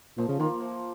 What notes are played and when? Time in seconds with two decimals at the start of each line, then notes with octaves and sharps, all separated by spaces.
0.17 A#2 F3
0.29 C#3
0.39 D#3 A#3 F4
0.61 F3